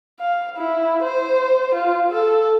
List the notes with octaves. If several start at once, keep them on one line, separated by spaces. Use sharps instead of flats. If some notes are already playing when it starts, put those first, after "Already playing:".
F5
E4
C5
F4
A4